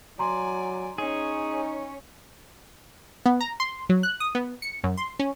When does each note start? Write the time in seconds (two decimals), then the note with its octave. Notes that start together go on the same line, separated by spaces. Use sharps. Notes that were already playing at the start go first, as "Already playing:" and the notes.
0.19 F#3 D5 G#5 A#5 C6
0.98 C#4 D#4 G#4 C#5
3.26 B3
3.41 A#5
3.60 C6
3.89 F#3
4.03 F#6
4.20 D#6
4.35 B3
4.62 C#7
4.84 F#2
4.97 C6
5.19 C#4